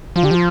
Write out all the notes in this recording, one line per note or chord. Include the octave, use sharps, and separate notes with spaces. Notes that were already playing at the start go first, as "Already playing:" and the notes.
F3 F4
D3 G4
F3 F4